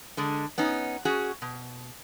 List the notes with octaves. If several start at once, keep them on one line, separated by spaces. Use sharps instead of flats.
D3 G#3
B3 C#4 D#4
C#4 F#4 G#4
B2